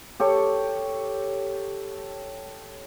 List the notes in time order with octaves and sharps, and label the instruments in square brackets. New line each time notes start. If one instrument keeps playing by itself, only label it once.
[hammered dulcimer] G4 A4 C#5